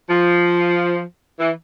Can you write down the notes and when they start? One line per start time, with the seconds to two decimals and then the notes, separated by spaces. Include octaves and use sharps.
0.09 F3
1.39 E3